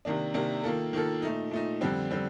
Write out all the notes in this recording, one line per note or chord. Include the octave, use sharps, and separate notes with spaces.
C3 D#3 A#3 D4
C3 D#3 A#3 D4
D#3 A#3 F4 A4
D#3 A#3 F4 A4
A#2 A3 D#4
A#2 A3 D#4
F2 D3 G3 C4
D3 G3 C4